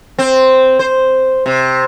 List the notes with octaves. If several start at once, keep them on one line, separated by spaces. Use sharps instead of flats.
C4
C5
C3